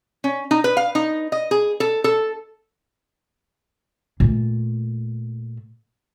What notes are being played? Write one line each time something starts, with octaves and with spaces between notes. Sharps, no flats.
C#4
D#4
B4
F5
D#4
D#5
G#4
A4
A4
A#2 A3